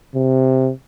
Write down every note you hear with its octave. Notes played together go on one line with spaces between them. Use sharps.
C3